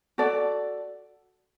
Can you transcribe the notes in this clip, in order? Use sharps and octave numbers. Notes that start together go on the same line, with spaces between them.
F#4 A4 D5